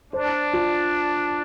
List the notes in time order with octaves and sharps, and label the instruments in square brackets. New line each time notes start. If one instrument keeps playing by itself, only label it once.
[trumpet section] D4 [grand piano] C5
[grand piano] F4